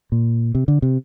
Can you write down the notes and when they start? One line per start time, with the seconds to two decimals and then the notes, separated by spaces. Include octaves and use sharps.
0.12 A#2
0.55 C3
0.68 D3
0.82 C3